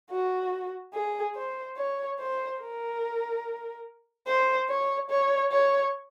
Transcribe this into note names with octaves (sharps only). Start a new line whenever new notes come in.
F#4
G#4
C5
C#5
C5
A#4
C5
C#5
C#5
C#5